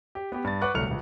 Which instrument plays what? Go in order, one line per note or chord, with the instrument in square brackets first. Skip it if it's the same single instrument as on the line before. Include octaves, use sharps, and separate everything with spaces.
[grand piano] G4
B3 G4
G2 A6
B4 F#5 C#6 D6 F#6
D1 C2 A3 F6 C#7 F7
D#1 C#2